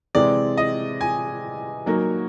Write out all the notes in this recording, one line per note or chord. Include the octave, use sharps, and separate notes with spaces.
C3 E3 G#3 C4 D5
D#5
G#5
F#3 A#3 D#4 F#4 A#4